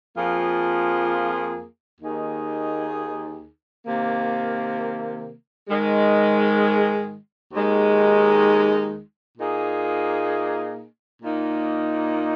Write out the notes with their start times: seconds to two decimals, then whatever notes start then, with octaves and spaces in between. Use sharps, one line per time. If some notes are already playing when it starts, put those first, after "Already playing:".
0.16 F2 F3 A#3 F4 G#4
2.00 D#2 D#3 A#3 D#4 G#4
3.85 C3 D#3 A#3
5.68 G#2 D#3 G#3
7.53 D#2 D#3 G#3 D#4
9.37 A#2 A#3 D#4 G#4
11.22 A#2 A#3 D#4